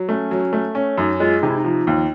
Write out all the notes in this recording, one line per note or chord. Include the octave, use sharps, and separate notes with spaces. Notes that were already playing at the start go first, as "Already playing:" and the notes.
Already playing: F#3
A3 C#4
F#3
A3
C#4
F#2 D#4
G#3 F4
C3 D#4
E4
D#4
F3
D#2